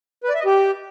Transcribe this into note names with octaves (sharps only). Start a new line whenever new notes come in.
B4
D5
E5
D#5
G4